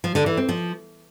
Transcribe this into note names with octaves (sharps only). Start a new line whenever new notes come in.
F3
D3
E3
C4
F3